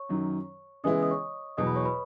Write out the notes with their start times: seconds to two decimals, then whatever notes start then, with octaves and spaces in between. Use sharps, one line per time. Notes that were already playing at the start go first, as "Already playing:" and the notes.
Already playing: C#5 C#6
0.09 F#2 D#3 F#3
0.84 C#3 E3 G#3 B3 E4 D#5 D#6
1.02 D#5 D#6
1.11 C#5 C#6
1.57 E2 B2 F#3 D#5 D#6
1.67 B4 B5
1.76 C#5 C#6
1.85 B4 B5